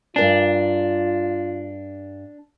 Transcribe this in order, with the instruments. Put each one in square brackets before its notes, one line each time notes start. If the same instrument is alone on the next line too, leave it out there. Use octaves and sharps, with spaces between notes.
[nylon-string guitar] G2 A#4 G#5 [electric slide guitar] D4 [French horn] F4